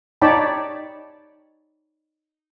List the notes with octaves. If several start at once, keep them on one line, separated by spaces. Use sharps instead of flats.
D#4 C#5 D5 G5 A5 B5